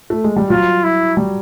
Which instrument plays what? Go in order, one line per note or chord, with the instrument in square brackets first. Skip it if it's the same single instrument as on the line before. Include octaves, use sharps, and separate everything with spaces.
[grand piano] A3
G#3
G3
[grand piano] F#3 [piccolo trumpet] F4
[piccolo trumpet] E4
[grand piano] G3